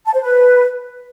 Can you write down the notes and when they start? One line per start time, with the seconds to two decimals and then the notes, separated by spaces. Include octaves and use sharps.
0.06 A5
0.14 C5
0.21 B4